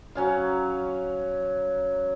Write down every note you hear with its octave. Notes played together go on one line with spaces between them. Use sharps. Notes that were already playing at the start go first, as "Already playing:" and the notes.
F#3 C#4 F5